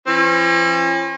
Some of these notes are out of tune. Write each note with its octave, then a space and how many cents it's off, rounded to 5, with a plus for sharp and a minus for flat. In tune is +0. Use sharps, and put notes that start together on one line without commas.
F3 -45 C#4 -40